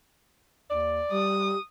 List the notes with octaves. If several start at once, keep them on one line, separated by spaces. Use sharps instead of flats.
D#2 D5
G3 G4 D#6